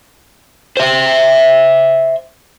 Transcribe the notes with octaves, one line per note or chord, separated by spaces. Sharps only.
C5 E5